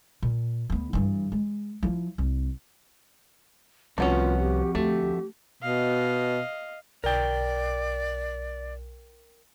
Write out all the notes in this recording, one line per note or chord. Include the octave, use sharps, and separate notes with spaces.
A#2
D2 B3
G2 E3
G#3
F3 E4
C2
C2 F2 A3 B3 C#4 F4 F#4
G4
D2 A3 G4
B2 D#5 F5
B1 A#4 D5 G5